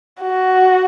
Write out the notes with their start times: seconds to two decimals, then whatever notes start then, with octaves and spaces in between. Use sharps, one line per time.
0.21 F#4